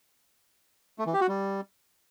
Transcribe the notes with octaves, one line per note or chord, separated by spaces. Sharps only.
A3
E3
G4
F#4
G3